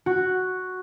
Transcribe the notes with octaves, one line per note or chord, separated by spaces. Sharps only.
F#4